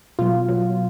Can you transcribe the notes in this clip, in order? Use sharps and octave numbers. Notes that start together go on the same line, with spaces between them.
B2 F#3 F4
B2 F#3